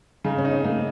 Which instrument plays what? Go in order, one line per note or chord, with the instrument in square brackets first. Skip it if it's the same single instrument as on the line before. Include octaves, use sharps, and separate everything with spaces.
[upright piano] C#3 [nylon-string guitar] D#4
[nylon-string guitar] C#4
[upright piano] D#4
[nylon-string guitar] C4
[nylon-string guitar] A3 [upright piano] A#3